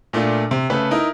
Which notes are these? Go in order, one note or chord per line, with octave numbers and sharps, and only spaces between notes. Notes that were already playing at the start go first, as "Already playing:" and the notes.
A#2 A3 D4 F4
C3
C#3 A3 A4 B4
D#4 E4 A#4